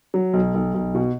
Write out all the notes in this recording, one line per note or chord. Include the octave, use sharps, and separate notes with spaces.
F#3
B1
B1
B1
B2